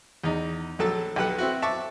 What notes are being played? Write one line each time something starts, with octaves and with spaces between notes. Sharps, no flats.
E2 D#4
A#1 F#3 A4 A5 E6
B1 G4 B4 F#5
C4 E4 F#4
E5 A5 C#6 D6